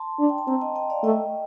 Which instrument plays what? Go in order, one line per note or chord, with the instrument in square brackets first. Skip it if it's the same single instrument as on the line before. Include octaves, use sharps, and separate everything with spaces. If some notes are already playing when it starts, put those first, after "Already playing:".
Already playing: [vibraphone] A5 C6
[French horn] D4
[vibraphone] G5
A5
[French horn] C4 [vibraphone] G5 A#5
[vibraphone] D#5 G5
D#5 G5
D5 F5
[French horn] A3 [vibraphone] D#5 G5